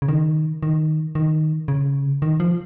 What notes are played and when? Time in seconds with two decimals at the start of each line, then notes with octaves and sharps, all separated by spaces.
0.02 C#3
0.08 D#3
0.63 D#3
1.15 D#3
1.68 C#3
2.22 D#3
2.40 F3